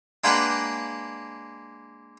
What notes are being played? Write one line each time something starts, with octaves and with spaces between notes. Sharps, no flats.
G#3 A#3 D4 B4 F#5 G5